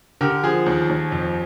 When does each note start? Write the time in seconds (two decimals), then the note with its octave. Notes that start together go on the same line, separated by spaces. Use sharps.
0.21 D3 G4 A#4
0.43 F3 G#4 C5
0.66 D#2
0.89 D#2
1.12 F2